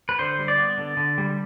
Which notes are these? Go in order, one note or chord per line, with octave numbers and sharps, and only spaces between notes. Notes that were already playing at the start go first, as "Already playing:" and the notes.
B4
D3 C5
G3
D5
B3
D3
D3
G3